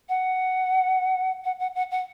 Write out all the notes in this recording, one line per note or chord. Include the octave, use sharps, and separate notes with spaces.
F#5
F#5
F#5
F#5
F#5